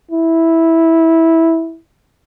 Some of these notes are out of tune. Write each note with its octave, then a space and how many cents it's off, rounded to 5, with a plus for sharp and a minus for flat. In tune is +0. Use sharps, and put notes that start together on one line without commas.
E4 -10